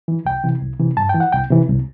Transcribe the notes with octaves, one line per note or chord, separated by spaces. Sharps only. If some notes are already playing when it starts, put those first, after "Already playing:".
E3
C2 G5
C3 E3
C2
C3 E3
G2 A5
E3 G5
F#5
C2 G5
C3 E3
C2